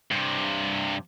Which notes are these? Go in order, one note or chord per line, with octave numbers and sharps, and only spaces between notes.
G2 C3